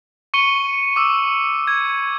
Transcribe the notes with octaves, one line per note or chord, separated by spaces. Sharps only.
C#6 C#7 D#7 G7
D6 E6
G#6